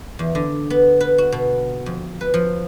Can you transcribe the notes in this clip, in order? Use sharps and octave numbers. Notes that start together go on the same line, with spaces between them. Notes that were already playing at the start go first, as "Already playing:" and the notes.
E2
D3
B3
B4
F#4
B2
F2
B4
F3